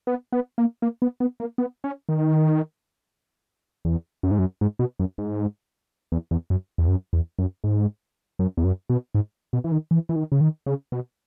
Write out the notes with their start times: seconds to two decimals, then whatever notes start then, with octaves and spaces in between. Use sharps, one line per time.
0.07 B3
0.32 B3
0.58 A#3
0.82 A#3
1.02 B3
1.20 B3
1.40 A#3
1.58 B3
1.84 C#4
2.09 D#3
3.85 E2
4.23 F#2
4.31 G#2
4.39 F#2
4.61 G#2
4.79 B2
4.99 F#2
5.18 G#2
6.12 E2
6.31 E2
6.50 F#2
6.78 E2
6.88 F#2
7.13 E2
7.39 F#2
7.64 G#2
8.39 F#2
8.57 E2
8.64 F#2
8.89 B2
9.14 G#2
9.53 B2
9.64 E3
9.72 D#3
9.91 E3
10.09 E3
10.16 D#3
10.32 C#3
10.41 D#3
10.66 C#3
10.92 B2